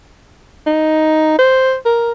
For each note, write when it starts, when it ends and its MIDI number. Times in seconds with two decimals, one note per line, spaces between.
0.66 1.37 63
1.39 1.75 72
1.85 2.12 70